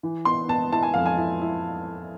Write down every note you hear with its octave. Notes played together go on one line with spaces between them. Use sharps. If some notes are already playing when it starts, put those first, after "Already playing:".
E3
B3 C6
B3 A5
E4 A5
G#5
F2 F5
G#5
E4
E4